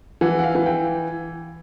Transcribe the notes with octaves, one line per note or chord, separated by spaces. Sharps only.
E3 F#5
F#5
F5
E3
G5